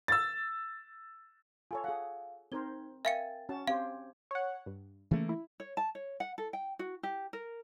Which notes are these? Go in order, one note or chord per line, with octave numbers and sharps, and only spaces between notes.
E6 A6
F4 A4 C#5 G#5
G#4 F5 F#5
C4 D#4 A#4 C5 G#6 G7
A#4 E5 F5 G5 G#5 A6 C#7
C#4 F#4 A5
C4 G4 C5 F5 G#6
C#5 F#5
G2
C#3 E3 A3 A#3
E4
C#5
A5
C#5
F#5
A4
G5
F#4
G4
A#4